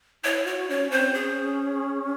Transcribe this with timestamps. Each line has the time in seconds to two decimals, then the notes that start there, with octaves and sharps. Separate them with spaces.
0.24 E4 C#5
0.46 F#4 C#5
0.69 C#4 C#5
0.91 C4 C5
1.14 C#4 G#4